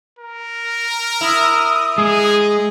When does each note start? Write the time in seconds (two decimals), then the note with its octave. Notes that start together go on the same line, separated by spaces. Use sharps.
0.19 A#4
1.21 E4 D#6
1.98 G#3 G#4